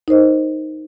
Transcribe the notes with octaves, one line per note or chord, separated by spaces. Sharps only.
D#4 A#4 C5 D#5